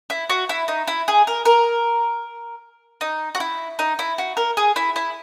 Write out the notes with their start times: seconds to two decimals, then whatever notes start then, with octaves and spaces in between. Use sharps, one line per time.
0.10 E4
0.30 F#4
0.49 E4
0.68 D#4
0.87 E4
1.08 G#4
1.27 A#4
1.45 A#4
3.01 D#4
3.35 F#4
3.40 E4
3.79 D#4
3.99 E4
4.18 F#4
4.37 A#4
4.57 G#4
4.76 E4
4.96 E4